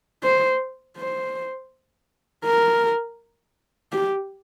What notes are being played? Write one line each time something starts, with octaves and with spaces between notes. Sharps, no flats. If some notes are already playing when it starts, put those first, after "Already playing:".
C5
C5
A#4
G4